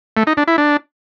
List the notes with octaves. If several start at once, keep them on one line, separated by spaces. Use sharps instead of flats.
A3
D#4
D4
E4
D4